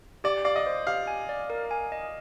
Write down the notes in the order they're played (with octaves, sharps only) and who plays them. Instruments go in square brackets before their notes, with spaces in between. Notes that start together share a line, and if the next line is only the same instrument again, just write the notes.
[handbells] G4 [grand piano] D5
[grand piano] D5 [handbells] F5
[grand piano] D#5
[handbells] C5
[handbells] G4 [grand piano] F5
[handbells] G#5
D5
A#4
G#5
D#5